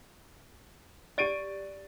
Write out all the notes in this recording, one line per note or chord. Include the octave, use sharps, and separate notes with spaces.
G4 D5 A6 D7 D#7